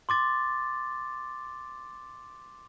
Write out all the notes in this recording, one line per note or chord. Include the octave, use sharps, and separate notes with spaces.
C6 D6 A6